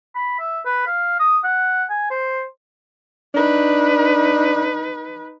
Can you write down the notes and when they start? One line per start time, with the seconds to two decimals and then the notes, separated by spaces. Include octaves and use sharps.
0.15 B5
0.39 E5
0.65 B4
0.87 F5
1.19 D#6
1.44 F#5
1.90 G#5
2.11 C5
3.35 D4 D#4 B4